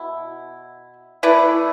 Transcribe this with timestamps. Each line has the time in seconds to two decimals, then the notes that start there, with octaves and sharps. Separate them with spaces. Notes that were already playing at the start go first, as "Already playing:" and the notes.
Already playing: B2 E4
1.23 A3 E4 B4 D5